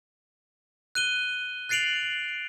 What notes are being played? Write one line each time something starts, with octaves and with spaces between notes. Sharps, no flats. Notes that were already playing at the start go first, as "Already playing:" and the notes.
F#6 D#7 G7
F#6 A6 C7 D7 F7 F#7